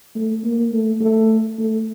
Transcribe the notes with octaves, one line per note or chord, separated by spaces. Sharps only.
A3
A#3
A3
A3
A3